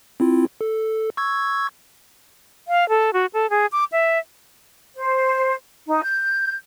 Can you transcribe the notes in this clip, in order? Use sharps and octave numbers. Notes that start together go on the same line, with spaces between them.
C4 E4 F4
A4
C#6 E6 G#6
F5
A4
F#4
A4
G#4
D6
E5
C5
D#4
G6